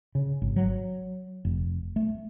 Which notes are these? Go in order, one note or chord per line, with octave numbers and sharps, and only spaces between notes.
C#3
G#1
F#3
F1
A3